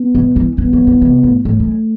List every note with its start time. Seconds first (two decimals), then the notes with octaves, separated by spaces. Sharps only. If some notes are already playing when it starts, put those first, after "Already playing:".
Already playing: B3
0.15 B2
0.36 E3
0.58 E3 B3
0.73 F#3
0.87 E3
1.01 C3
1.23 A2
1.45 A2 A3
1.60 F#2